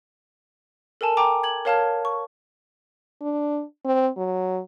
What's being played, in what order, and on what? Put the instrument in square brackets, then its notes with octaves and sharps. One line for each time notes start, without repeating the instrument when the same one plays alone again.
[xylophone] A4 A#4 G#5 A5
G5 G#5 A#5 D6
G#6 F#7
A#4 C#5 F5 A5 F6 G#6
C#6
[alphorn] D4
C4
F#3